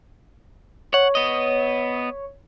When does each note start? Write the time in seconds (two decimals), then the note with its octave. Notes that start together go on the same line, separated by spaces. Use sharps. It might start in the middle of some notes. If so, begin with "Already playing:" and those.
0.94 C#5 F#5
1.15 B3 D#5